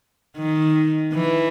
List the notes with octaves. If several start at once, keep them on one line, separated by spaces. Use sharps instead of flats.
D#3
E3